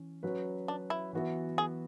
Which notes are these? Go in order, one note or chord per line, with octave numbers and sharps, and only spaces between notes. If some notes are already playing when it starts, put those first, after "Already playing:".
Already playing: E3 C#4
F#3 C#4 F#4 B4
D4
E4
E3 B3 F#4 B4 E5
G#4